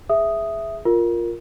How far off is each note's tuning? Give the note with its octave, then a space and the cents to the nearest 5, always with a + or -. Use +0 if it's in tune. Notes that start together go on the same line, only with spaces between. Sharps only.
G#4 +0 E5 +0 D#6 +0
F4 +0 A#4 +0